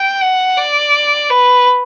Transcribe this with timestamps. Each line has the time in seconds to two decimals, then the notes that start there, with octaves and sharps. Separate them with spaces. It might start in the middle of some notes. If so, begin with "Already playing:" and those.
Already playing: G5
0.21 F#5
0.58 D5
1.30 B4